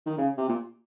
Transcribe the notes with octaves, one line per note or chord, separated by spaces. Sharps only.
D#3
C#3
C3
A#2